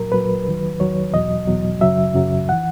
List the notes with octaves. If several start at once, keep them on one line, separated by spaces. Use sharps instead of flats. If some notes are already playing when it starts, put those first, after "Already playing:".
Already playing: A#2 F#3 A#4
A#2 F#3 B4
E2 D#3 F#3
E2 D#3 F#3 C#5
E2 B2 F#3 D#5
E2 B2 F#3
F#2 C#3 F#3 E5
F#2 C#3 F#3
E3 F#5